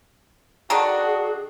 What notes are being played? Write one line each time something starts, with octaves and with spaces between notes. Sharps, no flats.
D3 D#3 D4 F#4 G#4